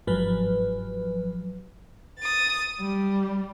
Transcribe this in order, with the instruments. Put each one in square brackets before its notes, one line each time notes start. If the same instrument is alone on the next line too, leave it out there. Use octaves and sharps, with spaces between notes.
[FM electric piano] G1 G#2 F3 F#3 B4
[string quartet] D#6 A6
G3